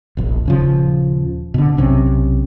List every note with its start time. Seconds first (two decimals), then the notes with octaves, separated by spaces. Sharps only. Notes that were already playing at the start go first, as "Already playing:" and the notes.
0.17 E1 A#1
0.46 D#1 C#3 F3
1.54 B2 D3
1.77 B1 C3 C4 C#4